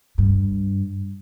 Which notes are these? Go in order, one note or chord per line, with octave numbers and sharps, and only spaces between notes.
G2